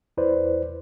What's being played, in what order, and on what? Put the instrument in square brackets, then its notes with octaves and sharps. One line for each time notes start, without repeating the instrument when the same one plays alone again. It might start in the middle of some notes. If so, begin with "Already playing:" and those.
[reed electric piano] E2 E4 B4 C5 D5